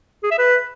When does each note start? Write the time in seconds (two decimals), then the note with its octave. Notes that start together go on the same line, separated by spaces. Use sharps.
0.23 G#4
0.31 E5
0.38 B4